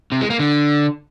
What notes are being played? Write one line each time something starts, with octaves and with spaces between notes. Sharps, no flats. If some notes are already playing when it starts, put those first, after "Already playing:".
C3
G#3
A#3
D3